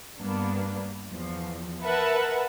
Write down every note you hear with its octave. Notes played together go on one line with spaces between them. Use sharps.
G2 A#3 B3 D4
E2 F3
A#4 B4 E5 F#5 A5